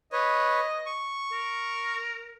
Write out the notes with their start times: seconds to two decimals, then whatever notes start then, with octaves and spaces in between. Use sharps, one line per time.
0.13 B4 C#5 D#5
0.86 C#6
1.32 A#4